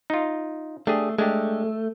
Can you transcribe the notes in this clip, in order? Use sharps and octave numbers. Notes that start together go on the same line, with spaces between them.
D#4 F4
A3 D4 G4 G#4
G#3 A3 D4 G4